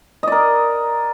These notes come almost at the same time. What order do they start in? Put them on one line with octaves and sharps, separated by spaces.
D#5 D5 A#4